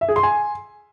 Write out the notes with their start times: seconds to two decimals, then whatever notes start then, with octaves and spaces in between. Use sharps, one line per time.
0.01 E5
0.09 G#4
0.16 C6
0.23 G#5